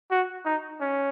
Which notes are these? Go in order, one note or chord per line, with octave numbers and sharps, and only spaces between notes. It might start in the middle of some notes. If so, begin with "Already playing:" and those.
F#4
D#4
C#4